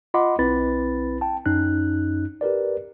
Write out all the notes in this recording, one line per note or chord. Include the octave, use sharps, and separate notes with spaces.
F4 D#5 F#5 B5 C6 D6
B1 C4 E4 B4 B5 A6
G5 A5
F#2 C#4 D#4 F#6
G4 A#4 B4 D5